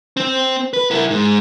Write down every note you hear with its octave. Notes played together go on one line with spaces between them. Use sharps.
C4
B4
E4 A#4
G#2